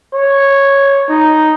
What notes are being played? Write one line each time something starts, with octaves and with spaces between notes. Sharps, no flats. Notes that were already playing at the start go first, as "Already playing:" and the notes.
C#5
D#4